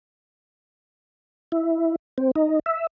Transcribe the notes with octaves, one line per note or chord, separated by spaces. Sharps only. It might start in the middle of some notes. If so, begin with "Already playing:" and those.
E4
C4
D#4
E5